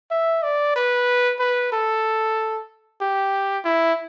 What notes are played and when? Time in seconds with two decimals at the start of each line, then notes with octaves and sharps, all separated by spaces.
0.11 E5
0.43 D5
0.76 B4
1.39 B4
1.72 A4
3.01 G4
3.65 E4